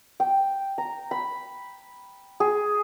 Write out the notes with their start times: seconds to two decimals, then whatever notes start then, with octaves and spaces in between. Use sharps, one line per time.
0.20 G5
0.78 A#5
1.11 B5
2.40 G#4